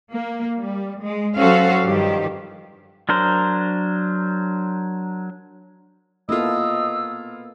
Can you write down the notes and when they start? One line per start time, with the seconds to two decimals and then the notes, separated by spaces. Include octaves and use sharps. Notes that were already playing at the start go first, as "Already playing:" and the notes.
0.11 A#3
0.59 G3
1.03 G#3
1.35 F#3 C#4 F#4 A4 C5 F5
1.83 G2 D#3 F3 G3 G4
3.09 F#3 D4 A#4 C5
6.29 A#3 B3 E4 F4 A4 D#5 E6